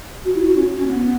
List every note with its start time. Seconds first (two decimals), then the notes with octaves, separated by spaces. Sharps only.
0.24 F#4
0.35 E4
0.46 F#4
0.55 C#4
0.77 C#4
0.87 B3